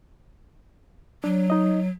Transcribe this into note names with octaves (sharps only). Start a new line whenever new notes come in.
F#3 D4
D#4 D#5